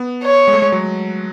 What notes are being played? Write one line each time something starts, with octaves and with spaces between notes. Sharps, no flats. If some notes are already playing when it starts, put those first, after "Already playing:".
Already playing: B3
C#5
G#3
A3
G#3
F#3